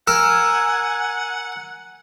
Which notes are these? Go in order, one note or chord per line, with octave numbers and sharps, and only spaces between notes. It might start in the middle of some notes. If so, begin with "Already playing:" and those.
A#4 F#5 G#5 E6